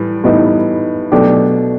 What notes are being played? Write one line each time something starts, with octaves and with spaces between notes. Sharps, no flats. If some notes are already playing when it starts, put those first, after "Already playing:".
Already playing: A2 E3 G3
A2 E3 G3 B3 D#4
B2 F#3 A3 D4 G4